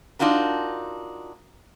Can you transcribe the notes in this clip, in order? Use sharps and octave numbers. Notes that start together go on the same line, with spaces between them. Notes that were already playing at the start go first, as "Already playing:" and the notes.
D4 D#4 F4 F#4 A#4